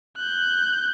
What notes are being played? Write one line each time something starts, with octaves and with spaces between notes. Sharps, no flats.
F#6 G6